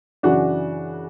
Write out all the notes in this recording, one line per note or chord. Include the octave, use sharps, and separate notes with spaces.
F#2 C#3 E3 D4 F#4